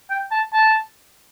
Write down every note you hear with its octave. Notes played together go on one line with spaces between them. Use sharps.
G5
A5
A5